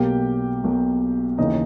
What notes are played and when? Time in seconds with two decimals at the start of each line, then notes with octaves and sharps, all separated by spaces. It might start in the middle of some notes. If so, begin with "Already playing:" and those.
Already playing: B1 B2 A#3 G4 G5
0.64 B1 B2 A#3
1.38 D#2 C#3 E3 A#3 D#4 D#5